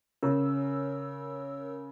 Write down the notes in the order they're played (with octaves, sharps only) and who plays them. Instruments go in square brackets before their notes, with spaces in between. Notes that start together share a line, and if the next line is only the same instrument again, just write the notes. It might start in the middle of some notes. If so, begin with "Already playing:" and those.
[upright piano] C#3 [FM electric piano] A#4 C#5 E6